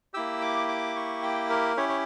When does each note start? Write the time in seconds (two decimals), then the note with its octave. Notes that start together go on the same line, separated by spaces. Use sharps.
0.14 A#3 E4 G4 E6
0.42 D6
0.68 D6
0.96 C#6
1.23 G5
1.50 A#4
1.77 C#4 E4 G4 C#5
1.89 C#5